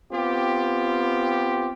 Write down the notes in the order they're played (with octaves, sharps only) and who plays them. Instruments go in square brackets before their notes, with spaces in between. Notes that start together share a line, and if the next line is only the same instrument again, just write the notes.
[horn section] B3 C4 F4 G4